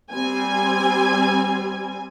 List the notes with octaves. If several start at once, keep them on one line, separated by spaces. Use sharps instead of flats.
G3 C4 G#5